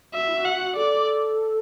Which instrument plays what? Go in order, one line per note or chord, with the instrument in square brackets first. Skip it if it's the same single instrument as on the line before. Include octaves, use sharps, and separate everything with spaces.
[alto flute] F#4 [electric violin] E5
[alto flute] E4
F#4
[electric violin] F#5
[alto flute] F#4
[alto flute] A4 [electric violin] D5